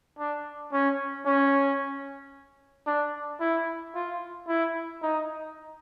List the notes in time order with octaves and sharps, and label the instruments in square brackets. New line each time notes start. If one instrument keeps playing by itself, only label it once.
[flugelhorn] D4
C#4
C#4
D4
E4
F4
E4
D#4